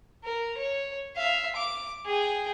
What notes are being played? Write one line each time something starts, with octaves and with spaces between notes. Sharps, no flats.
A#4
C#5
E5 F5
D6
G#4 G5